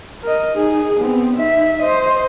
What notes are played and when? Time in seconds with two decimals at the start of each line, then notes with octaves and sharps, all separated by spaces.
0.23 A#4 D#5
0.55 D#4 G#4
1.00 B3 C4
1.35 D#4 E5
1.83 C5 D#5